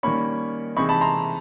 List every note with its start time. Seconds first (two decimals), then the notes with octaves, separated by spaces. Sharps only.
0.03 D#3 G3 A#3 C#4 B5 C#6
0.77 C3 E3 G#3 C4 D#4 B5 C#6
0.89 A5 B5
1.01 A#5 C6